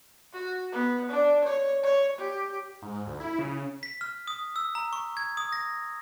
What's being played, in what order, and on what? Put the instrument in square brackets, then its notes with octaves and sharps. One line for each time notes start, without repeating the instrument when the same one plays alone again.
[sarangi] F#4
B3
D4
C#5
C#5
G4
[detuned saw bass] G#2
D2
E4
C#3
[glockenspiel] B6
F6
D#6
E6
A#5
C#6
G#6
D#6
A#6